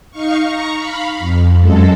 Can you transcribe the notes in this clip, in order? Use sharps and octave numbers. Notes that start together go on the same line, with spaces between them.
D#4 F5 C#6
A#5 C#6
F5 B5
F2
F#2 G#3 A4